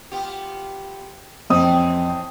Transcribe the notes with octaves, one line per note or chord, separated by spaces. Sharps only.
B3 F4 G4
F2 A2 E3 C4 D#5 D#6